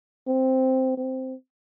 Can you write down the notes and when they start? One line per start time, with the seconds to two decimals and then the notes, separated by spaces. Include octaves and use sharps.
0.27 C4
0.97 C4